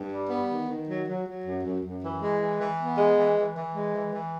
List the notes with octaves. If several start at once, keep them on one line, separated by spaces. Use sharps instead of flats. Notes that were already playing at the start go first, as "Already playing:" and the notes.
Already playing: G2
G3
B3
D#3
D#3
F#3
F#3
F#3
F#2
F#2
F#2
E3
G#3
E3
E3
B3
G#3
E3
E3
E3
G#3
E3
E3